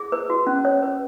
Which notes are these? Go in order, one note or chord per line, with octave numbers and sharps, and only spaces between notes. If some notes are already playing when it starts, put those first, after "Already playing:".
Already playing: G#4
B4
F#4
C#4
C#4 C#5
B4